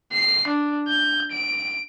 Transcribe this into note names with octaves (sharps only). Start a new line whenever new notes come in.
C7
D4
G6
D7